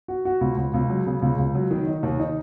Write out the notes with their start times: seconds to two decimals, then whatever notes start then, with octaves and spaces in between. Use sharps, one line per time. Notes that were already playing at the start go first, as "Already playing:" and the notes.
0.08 F#4
0.25 F#4
0.41 C#2
0.57 C#2
0.74 C#2
0.90 F#3
1.06 C#3
1.22 C#2
1.39 C#2
1.55 F#3
1.71 D#3
1.87 D#4
2.03 D#2
2.20 D#4